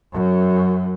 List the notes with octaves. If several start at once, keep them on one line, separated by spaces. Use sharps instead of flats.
F#2